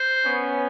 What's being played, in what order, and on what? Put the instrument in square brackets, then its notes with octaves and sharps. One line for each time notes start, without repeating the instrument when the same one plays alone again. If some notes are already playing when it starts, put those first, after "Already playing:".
Already playing: [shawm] C5
[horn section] B3 C#4